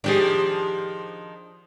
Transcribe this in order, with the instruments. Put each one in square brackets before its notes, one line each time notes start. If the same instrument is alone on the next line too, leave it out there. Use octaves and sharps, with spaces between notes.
[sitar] D#3 F3 [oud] D4 G4 G#4